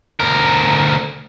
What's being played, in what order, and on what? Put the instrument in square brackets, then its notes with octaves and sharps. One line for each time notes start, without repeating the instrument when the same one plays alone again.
[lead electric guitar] D2 A#4